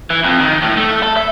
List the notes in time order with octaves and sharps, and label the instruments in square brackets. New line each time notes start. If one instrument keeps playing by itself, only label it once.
[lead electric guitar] E3
F2
D#3
A2
A3
A4
E5